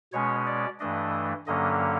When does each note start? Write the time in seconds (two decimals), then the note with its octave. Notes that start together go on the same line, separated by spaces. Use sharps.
0.13 B2 G#3 C#4 C#5
0.46 D5
0.79 G2 E3 A3 D4 D#5
1.47 G2 D3 F#3 A#3 C#4 D#5